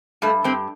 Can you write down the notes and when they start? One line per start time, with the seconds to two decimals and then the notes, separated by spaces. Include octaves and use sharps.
0.22 G2 A3
0.44 G2 C4